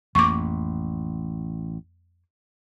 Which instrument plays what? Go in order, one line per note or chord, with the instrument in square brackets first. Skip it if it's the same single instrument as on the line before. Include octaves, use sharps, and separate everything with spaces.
[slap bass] A1 [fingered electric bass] F2 A#3 [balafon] C#6 D6